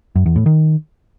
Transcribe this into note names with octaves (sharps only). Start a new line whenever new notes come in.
F#2
E2
A2
D#3